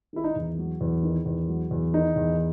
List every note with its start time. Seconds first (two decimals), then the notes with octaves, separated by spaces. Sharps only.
0.13 D#3 E4
0.24 D#4
0.36 E2
0.58 F#3
0.81 E2
1.03 D#3
1.26 E2
1.49 F#3
1.71 E2
1.94 D#3 D#4
2.16 E2